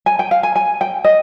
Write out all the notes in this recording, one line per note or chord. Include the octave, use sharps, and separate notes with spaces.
G#5
G5
F5
G#5
G#5
G5
D#5